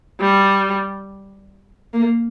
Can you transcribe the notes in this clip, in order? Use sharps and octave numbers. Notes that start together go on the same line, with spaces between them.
G3
A#3